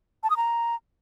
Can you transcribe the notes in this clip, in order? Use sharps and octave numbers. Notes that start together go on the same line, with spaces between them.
A5
D#6
A#5